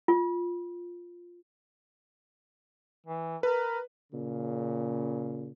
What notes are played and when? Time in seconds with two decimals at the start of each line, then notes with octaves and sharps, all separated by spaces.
0.08 F4
3.06 E3
3.43 A#4 B4
4.12 A#2 C#3